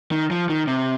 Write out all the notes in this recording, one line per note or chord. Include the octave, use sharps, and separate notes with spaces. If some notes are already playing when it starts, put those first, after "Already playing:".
D#3
F3
D#3
C3